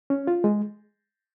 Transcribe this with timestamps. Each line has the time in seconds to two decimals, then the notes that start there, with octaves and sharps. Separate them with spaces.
0.10 C#4
0.27 F4
0.44 G#3